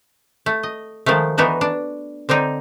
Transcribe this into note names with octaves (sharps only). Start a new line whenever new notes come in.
A3
D#5
D#3 F3 G#3 A3
E3 B3 D4 D#4 F#4
D4
D3 C4 D4 D#4